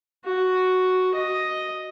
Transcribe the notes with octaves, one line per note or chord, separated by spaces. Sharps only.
F#4
D#5